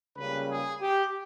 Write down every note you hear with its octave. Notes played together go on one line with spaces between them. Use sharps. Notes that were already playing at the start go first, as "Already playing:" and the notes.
C#2 C#3 G3 A#3 C#4 B4
G#4
G4